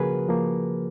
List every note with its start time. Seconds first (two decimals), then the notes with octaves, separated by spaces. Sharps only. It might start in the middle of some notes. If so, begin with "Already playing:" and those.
Already playing: C#3 F3 A#3 F#4 G#4 A#4 B4
0.28 F3 A#3